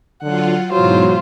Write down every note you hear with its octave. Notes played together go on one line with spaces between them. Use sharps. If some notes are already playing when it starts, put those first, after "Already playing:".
D3 F#3 F4 F#5
G#2 B2 E3 F#3 F4 C5